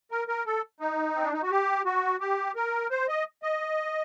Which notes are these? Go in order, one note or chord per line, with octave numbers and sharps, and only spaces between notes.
A#4
A#4
A4
D#4
C4
D4
D#4
F#4
G4
F#4
G4
A#4
C5
D#5
D#5